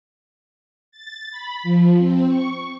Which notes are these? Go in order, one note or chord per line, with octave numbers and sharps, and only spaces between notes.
A6
B5
F3
C4
C#6